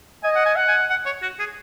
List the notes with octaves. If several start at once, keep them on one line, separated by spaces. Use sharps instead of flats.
D#5 G#5
F#5
G#5
F#5
G#5
F#5
C#5
F#4
G#4